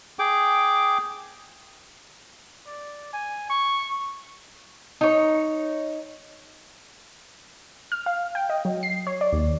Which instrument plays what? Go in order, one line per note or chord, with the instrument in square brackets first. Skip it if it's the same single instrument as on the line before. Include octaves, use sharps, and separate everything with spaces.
[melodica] G#4 G5 D6
[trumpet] D5
G#5
C#6
[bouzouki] D#4 C#5
[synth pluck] F6
F5
G5
D#5
F#3
C7
C#5
D5
D#2